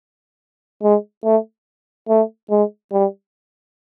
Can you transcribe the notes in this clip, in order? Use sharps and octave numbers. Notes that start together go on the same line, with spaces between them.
G#3
A3
A3
G#3
G3